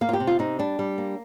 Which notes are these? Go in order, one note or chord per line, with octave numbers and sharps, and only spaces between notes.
A#3 F5
F4
G4
C3
F4
C3 D#4
G3 D4
G3
A#3